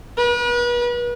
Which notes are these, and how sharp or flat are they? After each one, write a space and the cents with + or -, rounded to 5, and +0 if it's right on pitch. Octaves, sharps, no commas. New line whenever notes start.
B4 -40